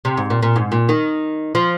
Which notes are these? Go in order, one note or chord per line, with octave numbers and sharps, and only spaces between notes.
C3
G#2
A#2
A#2
G#2
A#2
D#3
F3